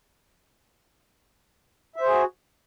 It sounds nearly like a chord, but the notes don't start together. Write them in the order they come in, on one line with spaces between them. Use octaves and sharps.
E5 C5 G#4 F#4